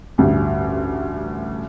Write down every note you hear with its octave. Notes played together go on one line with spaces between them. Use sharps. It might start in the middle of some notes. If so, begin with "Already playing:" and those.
A1 D2 G2